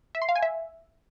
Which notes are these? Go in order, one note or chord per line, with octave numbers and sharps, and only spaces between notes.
E5
C6
F5
G#5
E5